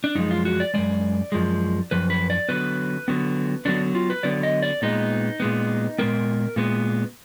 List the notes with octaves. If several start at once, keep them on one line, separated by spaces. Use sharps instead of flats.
D4
F#2 F3 G#3 D#4
F4
F#4
D5
F#2 F3 G#3 D5
F#2 F3 G#3
F#2 F3 B4
B4
D5
D3 F#3 B3 B4
D3 F#3 B3
D3 F#3 B3 D4
F4
B4
D3 F#3 B3 D5
D#5
D5
A#2 G#3 B3 D#4
A#2 G#3 B3
A#2 G#3 B3 A#4
A#2 G#3 B3